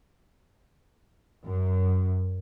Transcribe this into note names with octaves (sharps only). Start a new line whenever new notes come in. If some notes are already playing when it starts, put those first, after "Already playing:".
F#2